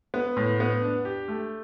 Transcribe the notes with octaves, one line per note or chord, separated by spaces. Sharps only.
B3
A2
B3
D4
G4
A3